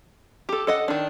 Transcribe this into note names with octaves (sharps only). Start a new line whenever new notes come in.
G4 A4
A4 D#5 F#5
D#3 D4